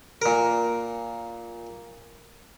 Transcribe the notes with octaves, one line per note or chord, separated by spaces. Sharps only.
A#2 A#4